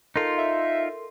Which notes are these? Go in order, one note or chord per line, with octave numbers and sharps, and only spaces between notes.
D#4 F4 A4 A#4 C6
E5